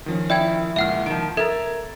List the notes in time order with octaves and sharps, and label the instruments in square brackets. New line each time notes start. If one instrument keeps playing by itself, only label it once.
[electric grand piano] D#3 F3 C#4
[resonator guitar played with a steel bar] E4 [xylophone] D5 G5 G#6
[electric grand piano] C#2 A#2 [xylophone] E5 F#5 F6
[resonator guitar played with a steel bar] D#3 F3 [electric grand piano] D7
[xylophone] A4 [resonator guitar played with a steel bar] A#4 E5 [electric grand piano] G#6 A6